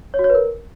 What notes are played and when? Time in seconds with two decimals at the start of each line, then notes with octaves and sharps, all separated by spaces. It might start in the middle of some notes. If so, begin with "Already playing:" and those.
0.14 C#5
0.19 F#4
0.24 C#5
0.29 B4
0.35 A#4